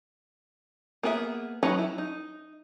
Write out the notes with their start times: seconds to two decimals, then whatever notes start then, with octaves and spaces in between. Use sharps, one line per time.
1.03 A#3 B3 G#4 B4 E5
1.63 F#3 C#4 D#4 B4
1.78 E4
1.98 D#4